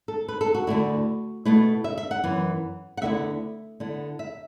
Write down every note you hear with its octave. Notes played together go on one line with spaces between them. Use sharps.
A4
B4
A4
F#4
D2 D3 A3 E4
B2 A3 E4 B4
E5
E5
F#5
F#2 E3 B3
F#5
D2 D3 B3 E4 E5
D3 B3 E4
E5